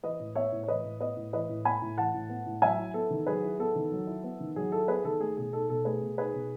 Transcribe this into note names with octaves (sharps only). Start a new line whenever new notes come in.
E3 B4 D#5
A2
B3 C#5 E5
A2
C#5
E3 B4 D#5
A2
B3 B4 D#5
A2
E3 B4 D#5
A2
B3 G#5 B5
A2
E3 F#5 A5
A2
B3
A2
F#3 E5 G#5
E4
B3 A4
D#3
F#3 G#4 B4
E4
B3 A4
D#3
F#3
E4
B3
D#3
F#3 G#4
E4 A4
B3 G#4 B4
D#3 A4
A3 G#4
B2 G#4
D#4 A4
B2 A4
A3 G#4 B4
B2
D#4 G#4 B4
B2